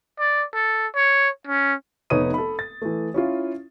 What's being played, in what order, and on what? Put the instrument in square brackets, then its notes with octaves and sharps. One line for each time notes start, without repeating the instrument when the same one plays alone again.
[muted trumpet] D5
A4
C#5
C#4
[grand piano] F1 B3 D#4 C#5 D#6 D#7
A4 B5
A6
E3 A3
C#4 E4 F4